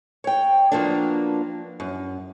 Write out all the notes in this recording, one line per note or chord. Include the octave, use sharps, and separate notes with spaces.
C#5 G5
F3 F#3 A#3 B3 D4
F#2